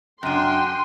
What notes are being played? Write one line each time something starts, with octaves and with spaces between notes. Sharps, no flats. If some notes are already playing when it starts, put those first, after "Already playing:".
F#2 D4 G5 C6 F#6 D#7